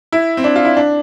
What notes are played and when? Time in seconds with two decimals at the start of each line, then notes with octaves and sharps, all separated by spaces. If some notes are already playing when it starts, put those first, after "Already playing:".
0.12 E4
0.37 C4
0.44 D4
0.56 F4
0.65 E4
0.77 D4